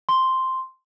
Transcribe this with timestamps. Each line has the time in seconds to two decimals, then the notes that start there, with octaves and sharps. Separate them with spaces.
0.09 C6